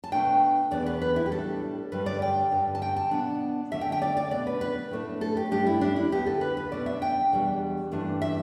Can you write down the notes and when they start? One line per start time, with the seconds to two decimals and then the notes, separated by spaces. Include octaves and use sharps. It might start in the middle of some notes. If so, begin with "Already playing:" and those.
0.04 A5
0.12 B2 A3 D4 G5
0.71 E2 B2 B3 D4 D5
0.86 B4
1.02 B4
1.16 E4
1.26 G4
1.31 A2 G3 D4 A4
1.92 G2 D3 G3 D4 B4
2.06 D5
2.22 G5
2.51 G2 D3 G3
2.75 A5
2.82 G5
2.96 A5
3.11 B2 B3 D4
3.72 D2 D3 A3 E5
3.81 G5
3.92 G5
4.02 D5
4.17 D5
4.31 B2 B3 D4 D5
4.47 B4
4.61 B4
4.91 A2 A3 D4
5.21 A4
5.37 G4
5.51 G2 G3 D4 G4
5.67 E4
5.81 D4
5.96 E4
6.11 D2 D3 B3 G4
6.27 A4
6.41 B4
6.57 B4
6.72 B2 B3 D4 D5
6.86 E5
7.02 G5
7.32 E2 B2 G3 D4
7.92 G2 E3 A3 D4
8.22 E5